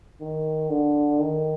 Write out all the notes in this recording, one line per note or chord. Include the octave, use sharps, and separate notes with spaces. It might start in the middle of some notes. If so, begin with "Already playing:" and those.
D#3
D3
D#3